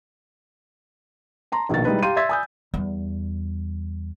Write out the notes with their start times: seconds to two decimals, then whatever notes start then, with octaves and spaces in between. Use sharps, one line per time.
1.52 A5 A#5 C6
1.69 A#1 B2 D#3 A#3 A6
1.85 G3 G#3 D#4 E4 B4
2.03 G4 F5 A#5 C6 G6 D#7
2.16 E5 C6 E6 G#6 A6 B6
2.29 G#5 B5 D#6 E6 G6
2.74 E2 G3